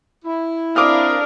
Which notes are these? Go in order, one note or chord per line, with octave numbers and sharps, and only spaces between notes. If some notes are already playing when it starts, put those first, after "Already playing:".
E4
C4 D4 A#4 F5 D6 D#6 F6